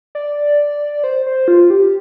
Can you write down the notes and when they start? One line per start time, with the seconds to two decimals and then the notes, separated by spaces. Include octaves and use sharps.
0.15 D5
1.04 C5
1.26 C5
1.48 F4
1.70 G4